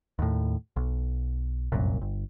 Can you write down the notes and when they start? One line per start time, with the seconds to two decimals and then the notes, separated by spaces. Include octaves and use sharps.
0.19 D#2 A2
0.76 B1
1.72 F1 C2 F#2 A#2
2.02 G1